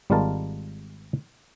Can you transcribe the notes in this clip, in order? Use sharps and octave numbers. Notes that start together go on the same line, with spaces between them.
G#1 G3 G#3 F4 A#4 A5